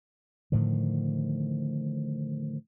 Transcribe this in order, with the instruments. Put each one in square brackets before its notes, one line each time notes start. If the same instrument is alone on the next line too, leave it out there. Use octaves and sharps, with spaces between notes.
[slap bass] A2 D3 D#3 F3